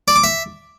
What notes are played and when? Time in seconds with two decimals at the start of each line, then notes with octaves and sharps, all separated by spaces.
0.08 D5
0.16 D6
0.24 E5